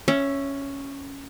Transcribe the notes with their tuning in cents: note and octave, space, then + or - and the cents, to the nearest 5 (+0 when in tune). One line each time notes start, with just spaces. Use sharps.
C#4 +0 E5 +15